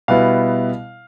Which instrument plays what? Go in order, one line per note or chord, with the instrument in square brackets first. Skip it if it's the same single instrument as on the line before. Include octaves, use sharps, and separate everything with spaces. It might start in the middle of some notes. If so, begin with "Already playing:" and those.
[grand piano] B2 G3 B3 E4 F5